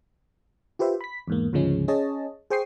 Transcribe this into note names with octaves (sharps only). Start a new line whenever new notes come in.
F4 G4 B4 C5 E5
B5 B6
E2 G#2 A#3
D2 G#2 C#3 F3 G#3 C#4
C#4 G#4 C#5 D#5 A5
G#4 C5 G5 C#6 D#6 C7